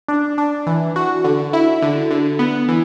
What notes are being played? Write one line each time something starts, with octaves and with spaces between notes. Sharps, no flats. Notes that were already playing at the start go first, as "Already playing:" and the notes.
D4
D4
E3
F#4
D3
E4
D3
D3
B3
E3